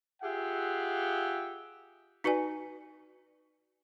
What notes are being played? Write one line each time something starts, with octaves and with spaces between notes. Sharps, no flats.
F4 G4 G#4 E5 F#5
D#4 F#4 B4 D5 G#5